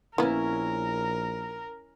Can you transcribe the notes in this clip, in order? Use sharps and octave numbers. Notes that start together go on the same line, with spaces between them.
A#1 A#3 B3 C#4 E4 A#4